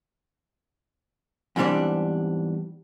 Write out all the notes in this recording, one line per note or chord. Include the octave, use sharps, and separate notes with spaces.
E2 G#2 E3 G3 C4 D4